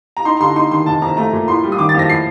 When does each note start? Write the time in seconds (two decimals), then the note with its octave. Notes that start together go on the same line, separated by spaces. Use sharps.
0.17 A#5
0.25 D#4 C6
0.37 A#5
0.40 D3 C6
0.56 D#4 C6
0.71 D#3 C6
0.86 F1 A5
1.02 F2 A#5
1.17 A3 A#5
1.33 A#2
1.48 A2 C6
1.64 G3
1.72 D#6
1.79 D#3 D6
1.89 A6
1.94 F2
1.99 A#6
2.09 A2 C7